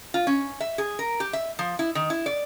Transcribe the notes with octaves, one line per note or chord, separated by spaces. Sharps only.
F4
C#4
E5
G#4
A#4
G4
E5
F3
E4
D#3
E4
D5